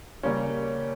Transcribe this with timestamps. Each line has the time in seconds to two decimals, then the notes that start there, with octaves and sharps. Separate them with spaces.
0.23 C#3 G3 A#3 C#4